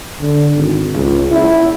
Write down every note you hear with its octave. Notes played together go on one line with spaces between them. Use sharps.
D3
G#1
C#2
E4